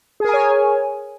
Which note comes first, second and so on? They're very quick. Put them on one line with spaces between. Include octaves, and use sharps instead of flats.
G#4 A#4 G#5 C#5